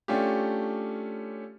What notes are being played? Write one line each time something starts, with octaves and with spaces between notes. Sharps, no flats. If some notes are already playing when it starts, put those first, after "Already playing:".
A3 C#4 D4 F4 G4